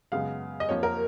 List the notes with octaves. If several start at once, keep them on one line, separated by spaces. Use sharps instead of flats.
F#2 C#3 G#3 B3 F5
D#5
F2 F3 A#3 C#5
A#4